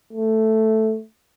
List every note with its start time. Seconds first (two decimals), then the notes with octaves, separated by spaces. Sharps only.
0.13 A3